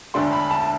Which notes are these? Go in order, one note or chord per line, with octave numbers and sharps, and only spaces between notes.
E1 D2 D3 A3 D4 C6
B5
A5
A5